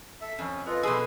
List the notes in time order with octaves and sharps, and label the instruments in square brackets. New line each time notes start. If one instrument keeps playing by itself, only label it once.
[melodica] A4 E5
[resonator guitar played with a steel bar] F2 [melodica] C#4
[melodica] F4 A4 D#5 [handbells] B4
[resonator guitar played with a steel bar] B2 G#4 [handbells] A4 D#6 E6 [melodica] C6